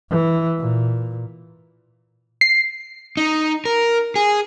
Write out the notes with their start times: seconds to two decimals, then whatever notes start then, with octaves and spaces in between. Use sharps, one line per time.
0.11 E3
0.59 A#2
2.41 C7
3.17 D#4
3.65 A#4
4.16 G#4